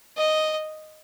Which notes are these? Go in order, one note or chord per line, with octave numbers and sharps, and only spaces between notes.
D#5